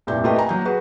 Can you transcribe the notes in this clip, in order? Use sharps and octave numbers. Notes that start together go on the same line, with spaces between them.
F1 G2 A#2 G3 E4 G6
A3 F4 G4 A#4 B4 D#5
G#5 A#5
F#3 A#3 G6
F#4 G#4 B4